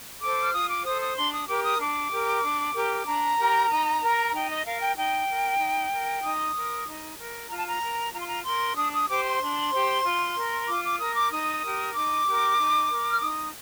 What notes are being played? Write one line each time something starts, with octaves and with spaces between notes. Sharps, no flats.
A4 C5 D6
F6
F4 D#6
D6
A4 C5 D#6
D#6
D4 C6
D#6
G4 A#4 D6
D#6
D4 D6
G4 A#4
D4
G4 A#4
D4 A#5
G4 A#4
D#4
A#4
D#4 G5
D#5
A#4 F5
G5
D#4 G5
A#4
D#4
A#4
D#4 D#6
A#4
D#4
A#4
F4 A#5
A5
A#5
A#4
F4 A#5
C6
A#5
A#4 C6
D4 D#6
D#6
G4 C5 D6
C6
D4
G4 C5
F4
A#4
F4 D6
D6
A#4 D#6
D6
D#4 D#6
G4 A#4
D#4 D6
G4 A#4
D#4
A#4
F6
D#4 D#6